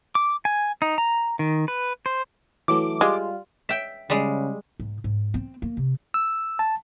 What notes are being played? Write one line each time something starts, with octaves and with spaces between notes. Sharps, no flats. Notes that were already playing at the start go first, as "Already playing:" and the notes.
D6
G#5
D#4
A#5
D#3
B4
C5
E3 F#3 A3 D6
G3 G#3 F4
E5 G5
C#3 G3 G#3
G#2
G#2
C4
A#3
C3
E6
A5